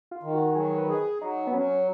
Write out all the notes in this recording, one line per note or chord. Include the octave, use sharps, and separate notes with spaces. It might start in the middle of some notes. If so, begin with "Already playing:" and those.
F4
D#3
F#4
F#4
F#3 G#4
B4
G#4
F#3 D#4
B3
F#3 C#4